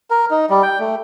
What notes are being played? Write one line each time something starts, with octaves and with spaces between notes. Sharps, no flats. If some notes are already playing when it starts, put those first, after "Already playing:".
A#4
D#4
G3
G5
A3